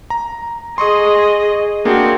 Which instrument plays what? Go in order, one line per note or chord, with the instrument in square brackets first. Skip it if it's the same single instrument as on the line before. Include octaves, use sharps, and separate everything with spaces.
[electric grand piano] A#5
[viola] G#4 D#5 [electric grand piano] C6 C#6 D#6
[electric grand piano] A#3 D4 G#4 [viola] C4 F#4